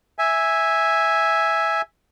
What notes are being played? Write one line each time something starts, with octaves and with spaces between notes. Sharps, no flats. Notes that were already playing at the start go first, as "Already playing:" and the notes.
E5 G#5